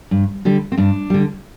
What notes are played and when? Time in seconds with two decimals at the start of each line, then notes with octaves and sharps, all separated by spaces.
0.11 G2
0.45 D3 G3
0.72 C4
0.77 G2 D4
1.10 D3 G3